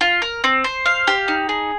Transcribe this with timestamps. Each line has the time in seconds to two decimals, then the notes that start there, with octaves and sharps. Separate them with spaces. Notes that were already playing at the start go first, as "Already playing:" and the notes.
0.01 F4
0.22 A#4
0.44 C4
0.64 C5
0.86 F5
1.07 G4
1.28 D#4
1.49 G#4